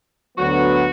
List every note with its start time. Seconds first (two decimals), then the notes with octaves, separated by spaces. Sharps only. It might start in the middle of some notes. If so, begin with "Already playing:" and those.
0.38 D2 D3 F#3 B3 F#4